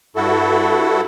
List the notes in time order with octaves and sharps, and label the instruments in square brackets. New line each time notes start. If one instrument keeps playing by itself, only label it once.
[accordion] G2 E4 F#4 A4